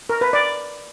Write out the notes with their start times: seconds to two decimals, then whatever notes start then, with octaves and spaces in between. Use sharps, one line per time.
0.09 A#4
0.21 B4
0.33 D5